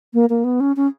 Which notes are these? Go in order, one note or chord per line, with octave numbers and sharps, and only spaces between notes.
A#3
A#3
B3
C#4
C#4